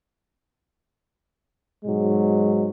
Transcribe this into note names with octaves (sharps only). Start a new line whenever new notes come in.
G#2 B2 F#3 G#3